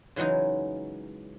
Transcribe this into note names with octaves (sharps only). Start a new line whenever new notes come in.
C#3 E3 F#3 G#3 D#4